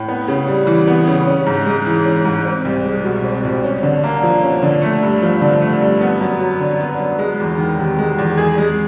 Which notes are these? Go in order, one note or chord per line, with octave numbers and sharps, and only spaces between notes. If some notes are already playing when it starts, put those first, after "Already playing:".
Already playing: A2
B3
C#3
G3
E3
B3
C#3
C#4
G#2
G#3
E3
C#4
G#2
C4
C2
G#3
B2
C4
C2
C#4
D3
A#3
F3
C#4
D3
A3
G2
F3
D3
A3
G2
B3
F#2
F#3
D3
B3
F#2
G#3
E2
D#3
C3
G#3
E2
G#4
G#3